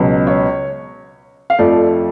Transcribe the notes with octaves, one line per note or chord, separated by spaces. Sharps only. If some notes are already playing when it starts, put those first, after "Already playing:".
Already playing: C#2 B2 F#3
C#5
F5
F2 F3 A3 D5